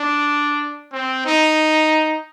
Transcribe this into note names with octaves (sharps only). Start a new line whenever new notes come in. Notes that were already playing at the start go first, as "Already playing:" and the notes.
Already playing: D4
C4
D#4